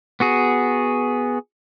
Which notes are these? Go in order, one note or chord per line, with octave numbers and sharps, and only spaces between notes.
B3 F#4 G#4